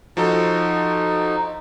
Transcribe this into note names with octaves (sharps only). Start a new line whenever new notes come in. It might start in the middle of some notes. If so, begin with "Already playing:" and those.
F3 D#4 F#4 A4